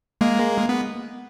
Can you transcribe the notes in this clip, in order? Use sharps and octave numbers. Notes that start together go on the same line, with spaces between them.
G#3 A#3
B3